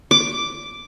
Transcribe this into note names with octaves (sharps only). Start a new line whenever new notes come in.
D6